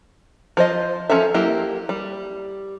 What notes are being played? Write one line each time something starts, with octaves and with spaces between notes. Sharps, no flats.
F3 C5 D#5
F3 C#4 F4 A4 E5
F#3 A#3 E4 G4
G3